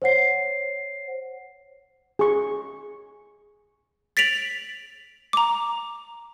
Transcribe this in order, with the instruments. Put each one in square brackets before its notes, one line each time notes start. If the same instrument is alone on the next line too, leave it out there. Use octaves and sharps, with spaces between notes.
[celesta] C5 C#5 F#5 C7
[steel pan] G#4 C#6
[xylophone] A6 B6 D7 F7 F#7
A#5 D6